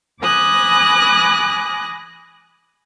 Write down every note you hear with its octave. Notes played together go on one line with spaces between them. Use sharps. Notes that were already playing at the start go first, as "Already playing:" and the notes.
G#5 B5 D6 D#6 F#6 A#6